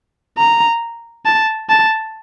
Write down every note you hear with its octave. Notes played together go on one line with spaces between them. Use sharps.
A#5
A5
A5